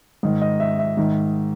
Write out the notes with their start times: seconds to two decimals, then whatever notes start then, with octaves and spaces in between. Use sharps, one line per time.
0.23 G#2 D#3
0.41 D#5
0.60 E5
0.79 E5
0.97 G#2 D#3